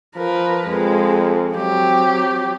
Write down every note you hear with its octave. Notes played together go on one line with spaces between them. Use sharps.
F3 A#4 B4
F2 G#3
F#3 C4 G4